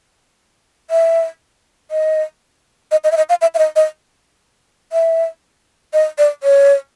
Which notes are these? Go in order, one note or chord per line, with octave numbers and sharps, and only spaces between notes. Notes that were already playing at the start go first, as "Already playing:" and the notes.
E5
D#5
D#5
D#5
E5
D#5
F5
E5
E5
D#5
D#5
E5
D#5
D5
C#5